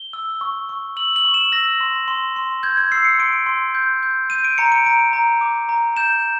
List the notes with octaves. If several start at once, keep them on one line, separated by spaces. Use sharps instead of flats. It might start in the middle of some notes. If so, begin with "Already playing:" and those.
Already playing: G7
E6
C#6
C#6
E6 F#7
F#7
C#6
E7
E6 A#6
C6
C6
C6
G6 G#6
G#6
E6 C7
C#7
C6 D7
C6
G6
G6
G6 D#7
D7
A#5 C#7
D7
A#5 D7
A#5
D6
A#5
G6 E7